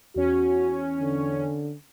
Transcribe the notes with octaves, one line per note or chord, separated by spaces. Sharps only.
E2 C#4 F#4
D3